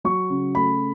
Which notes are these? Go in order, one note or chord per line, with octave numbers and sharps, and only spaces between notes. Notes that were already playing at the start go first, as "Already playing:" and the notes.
F#3 C#6
C#3
A3 B5